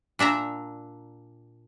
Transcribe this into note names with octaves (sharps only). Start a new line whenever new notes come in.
A#2 D4 E5 A#5